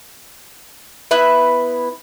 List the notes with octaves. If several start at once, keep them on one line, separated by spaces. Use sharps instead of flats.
B3 E4 B4 E5